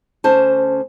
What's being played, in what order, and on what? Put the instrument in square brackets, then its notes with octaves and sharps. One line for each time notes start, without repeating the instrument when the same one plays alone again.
[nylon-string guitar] D2 C#4 C5 A5